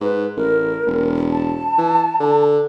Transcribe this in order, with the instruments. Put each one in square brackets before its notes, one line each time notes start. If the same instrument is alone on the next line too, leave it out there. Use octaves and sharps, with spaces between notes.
[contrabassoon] G#2 [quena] B4
[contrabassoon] A1 [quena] A#4
[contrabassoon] E1
[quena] A5
[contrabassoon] E3
D3